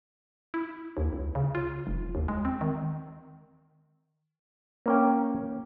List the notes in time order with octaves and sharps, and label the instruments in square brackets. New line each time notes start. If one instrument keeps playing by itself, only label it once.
[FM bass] E4
D#2
C#2
C#3
F4
F1
D#2
G#3
C4
D#3
[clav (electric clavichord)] A#3 C#4 G5